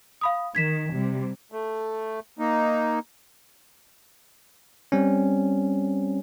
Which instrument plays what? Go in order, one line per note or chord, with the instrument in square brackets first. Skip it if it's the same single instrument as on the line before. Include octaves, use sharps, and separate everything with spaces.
[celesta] F5 B5 D#6
[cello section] D#3 [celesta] G#6 B6 E7
[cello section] C3 G3
[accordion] A3
A#3 D#4
[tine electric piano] G3 C4 C#4